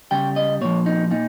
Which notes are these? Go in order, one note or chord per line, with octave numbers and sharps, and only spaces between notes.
C#3 G3 G5
D#5
A#2 F3 C#5
D#4
A#2 D#4